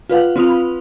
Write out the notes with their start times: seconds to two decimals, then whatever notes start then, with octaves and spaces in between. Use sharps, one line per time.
0.10 F4 B4 F5 F#5
0.36 C4 F4 C6 D#6 F7
0.49 B5